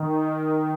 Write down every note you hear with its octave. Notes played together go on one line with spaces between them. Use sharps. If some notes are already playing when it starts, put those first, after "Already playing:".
Already playing: D#3